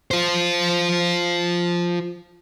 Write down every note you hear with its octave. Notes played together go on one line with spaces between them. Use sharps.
F4 C5